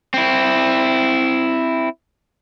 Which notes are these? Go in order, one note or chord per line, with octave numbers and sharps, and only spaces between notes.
C4 E4